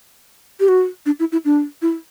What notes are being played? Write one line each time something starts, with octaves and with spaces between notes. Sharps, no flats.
G4
F#4
D4
E4
E4
D4
E4